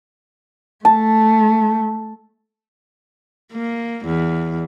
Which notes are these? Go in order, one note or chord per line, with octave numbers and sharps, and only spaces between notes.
A3 A5
A#3
E2